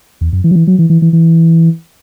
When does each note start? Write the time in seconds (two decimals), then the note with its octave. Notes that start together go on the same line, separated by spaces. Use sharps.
0.21 E2
0.33 F#2
0.44 E3
0.51 F#3
0.56 E3
0.67 F#3
0.79 E3
0.90 E3
1.02 E3
1.13 E3